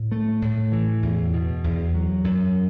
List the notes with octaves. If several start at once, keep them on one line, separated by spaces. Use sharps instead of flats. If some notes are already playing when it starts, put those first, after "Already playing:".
Already playing: A2
A3
A2
E3
E2
B2
E2
F#3
F#2